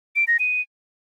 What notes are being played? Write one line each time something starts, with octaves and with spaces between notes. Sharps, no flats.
D7
A#6
D#7